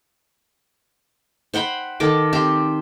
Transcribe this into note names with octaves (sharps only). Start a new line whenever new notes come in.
C5 F#5 G5 B5
D#3 A4 D6
C4 G4 C5